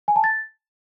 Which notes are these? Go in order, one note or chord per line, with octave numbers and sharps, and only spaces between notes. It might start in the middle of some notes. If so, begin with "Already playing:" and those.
G#5
A5
A6